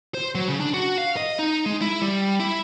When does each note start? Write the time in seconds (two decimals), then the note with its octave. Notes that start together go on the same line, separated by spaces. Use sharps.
0.14 C5
0.35 F#3
0.48 C#3
0.60 D4
0.74 F#4
0.98 F5
1.17 D#5
1.39 D#4
1.66 G#3
1.81 E4
2.02 G3
2.40 E4